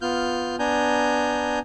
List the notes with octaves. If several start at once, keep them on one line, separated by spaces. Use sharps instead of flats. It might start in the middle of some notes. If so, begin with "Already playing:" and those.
B3 F4 F6 G6
B3 D4 G#5 A#5 G6